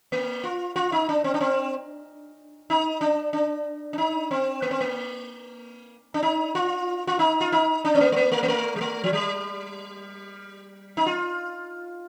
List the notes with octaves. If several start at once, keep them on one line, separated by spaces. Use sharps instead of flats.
A#3
F4
F4
D#4
D4
C4
D4
C4
D#4
D4
D4
D4
D#4
C4
A#3
C4
A#3
D4
D#4
F4
F4
D#4
F4
D#4
D4
C4
A#3
A3
A#3
A3
A#3
A3
G3
A3
F3
G3
D#4
F4